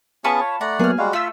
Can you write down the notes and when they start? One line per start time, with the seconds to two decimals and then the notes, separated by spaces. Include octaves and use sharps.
0.24 B3 C#4 F4 G#4 A5 B5 C#6
0.41 C#5
0.61 A3 D5 F#5 A#5
0.79 F#3 A#3 B3 G#4 F6
0.98 G3 G#3 F#4 F5
1.13 A3 F4 E6 B6